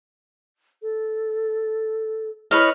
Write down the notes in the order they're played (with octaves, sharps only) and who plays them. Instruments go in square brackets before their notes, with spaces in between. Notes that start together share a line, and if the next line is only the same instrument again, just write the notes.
[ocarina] A4
[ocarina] E4 [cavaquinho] B4 C#5 D#5 [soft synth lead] F6